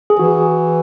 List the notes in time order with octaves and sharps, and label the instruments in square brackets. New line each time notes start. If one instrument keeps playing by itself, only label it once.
[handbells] G#4
[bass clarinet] E3 [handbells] F#4